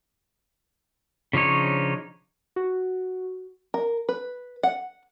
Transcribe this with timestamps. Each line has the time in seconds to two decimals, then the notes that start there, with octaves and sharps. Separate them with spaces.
1.33 C#3 F3 D4 D#4 C#5
2.56 F#4
3.74 A#4
4.09 B4
4.63 F#5